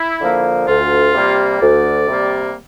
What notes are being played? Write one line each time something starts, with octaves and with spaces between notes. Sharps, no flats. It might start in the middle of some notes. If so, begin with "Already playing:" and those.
Already playing: E4
D3 F3 A#3
D2 F4
C3 G3 A#3
D2 D5
C3 G3 A#3